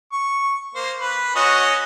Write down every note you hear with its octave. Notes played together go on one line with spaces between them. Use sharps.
C#6
A#3 C5
B4
C#4 F#4 D#5